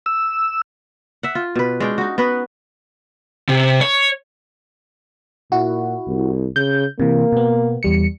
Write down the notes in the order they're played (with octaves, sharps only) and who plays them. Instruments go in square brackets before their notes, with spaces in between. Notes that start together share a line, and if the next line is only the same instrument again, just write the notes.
[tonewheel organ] E6
[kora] E5 F#5
F4
B2 B4
G#3 C#4 D4 G5
D#4 F#4
B3 F#4 B4
[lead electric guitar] C3
C#5
[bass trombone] A#2 [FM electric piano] E4 F#4
[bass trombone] C2
[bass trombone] C#3 [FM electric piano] G6
[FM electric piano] C3 E3 [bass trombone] A#3
[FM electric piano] B2 B3
E2 G3 C#7